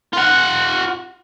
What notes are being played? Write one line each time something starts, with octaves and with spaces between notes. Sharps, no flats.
F4 F#5